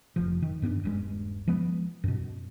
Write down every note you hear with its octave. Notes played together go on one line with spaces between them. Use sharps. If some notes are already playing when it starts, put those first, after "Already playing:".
F1 F3
D#3
G2 B3 C#4 D4
D#1 G2 G#3
F3 G#3 B3
F#2 B2